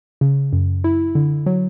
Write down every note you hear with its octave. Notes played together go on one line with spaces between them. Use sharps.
C#3
F#2
E4
D3
F#3